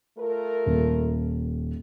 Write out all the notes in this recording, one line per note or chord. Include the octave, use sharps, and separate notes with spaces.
A3 F4 A#4
D#1